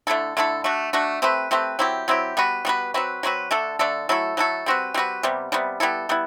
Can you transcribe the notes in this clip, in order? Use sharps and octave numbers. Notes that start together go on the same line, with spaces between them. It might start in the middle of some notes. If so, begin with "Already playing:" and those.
D3 A3 E4 A4
D3 A3 E4 A4
A3 D4 F#4
A3 D4 F#4
A3 C4 G4 B4
A3 C4 G4 B4
F#3 C4 E4 G4
F#3 C4 E4 G4
G3 B3 F#4 B4
G3 B3 F#4 B4
F#3 C4 F#4 B4
F#3 C4 F#4 B4
D3 A3 D4 A4
D3 A3 D4 A4
F#3 A3 E4 A4
F#3 A3 E4 A4
G3 C4 F#4 B4
G3 C4 F#4 B4
C3 G3 B3
C3 G3 B3
G3 B3 E4 A4
G3 B3 E4